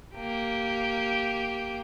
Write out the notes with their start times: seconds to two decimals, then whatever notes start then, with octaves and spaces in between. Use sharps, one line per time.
0.14 A#3 G4